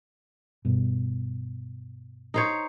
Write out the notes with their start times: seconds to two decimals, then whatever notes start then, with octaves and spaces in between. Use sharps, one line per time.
0.65 G2 B2
2.34 D#4 C5 C#5